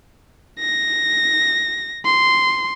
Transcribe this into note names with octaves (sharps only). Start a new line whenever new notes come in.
A#6
C6